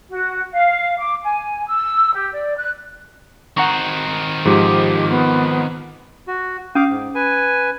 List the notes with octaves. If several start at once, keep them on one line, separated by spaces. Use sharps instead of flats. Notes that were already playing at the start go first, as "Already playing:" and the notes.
F#4
F5
D6
G#5
E6
G4
D5
F#6
D#3 C4 F#5 A#5 C#6
G#2 F3 G4
B3
F#4
C#4 F5 D6 D#6
G#2
B4 G#5